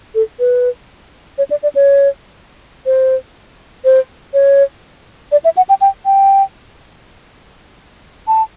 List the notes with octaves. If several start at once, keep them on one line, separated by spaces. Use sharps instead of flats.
A4
B4
C#5
D5
D5
C#5
C5
C5
C#5
D5
E5
F#5
G5
G5
G5
A5